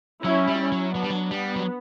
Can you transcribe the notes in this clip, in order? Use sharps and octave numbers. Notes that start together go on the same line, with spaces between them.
F#3 C#4 E4
G3
C#4 E4
F#3
F#3 B3 D4
G3
F#3
G3 B3
F#3